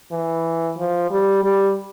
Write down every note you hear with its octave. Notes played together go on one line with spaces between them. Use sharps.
E3
F3
G3
G3